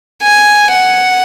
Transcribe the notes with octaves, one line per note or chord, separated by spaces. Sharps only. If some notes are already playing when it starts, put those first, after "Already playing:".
G#5
F#5